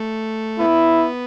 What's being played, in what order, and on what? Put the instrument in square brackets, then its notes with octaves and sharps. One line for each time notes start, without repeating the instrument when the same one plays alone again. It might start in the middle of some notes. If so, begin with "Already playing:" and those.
Already playing: [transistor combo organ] A3
[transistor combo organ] B3 [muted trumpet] E4